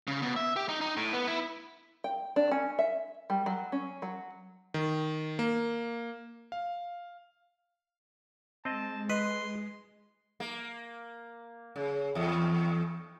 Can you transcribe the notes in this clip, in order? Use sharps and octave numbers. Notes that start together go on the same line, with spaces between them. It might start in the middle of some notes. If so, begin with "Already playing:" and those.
C#3
B2
E5
G4
D#4
D#4
A2
B3
E4
G5
D4
C#4
E5
G3
F#3
C#4
F#3
D#3
A#3
F5
G#3 C4 D#5 A5
B4 D#5 C6
A#3
C#3
E2